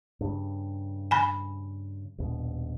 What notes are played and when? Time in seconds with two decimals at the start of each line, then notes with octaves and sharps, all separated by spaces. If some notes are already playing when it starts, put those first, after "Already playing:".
0.21 G2 C#3
1.11 G#5 B5
2.18 D#1 A#1 B2